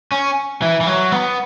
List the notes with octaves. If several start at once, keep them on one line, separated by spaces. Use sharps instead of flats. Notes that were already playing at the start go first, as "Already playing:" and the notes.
C#4
E3
E3
F#3
B3